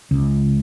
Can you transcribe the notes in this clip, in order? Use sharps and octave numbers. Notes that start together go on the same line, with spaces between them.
C#2